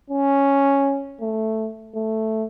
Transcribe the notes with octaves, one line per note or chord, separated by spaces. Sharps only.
C#4
A3
A3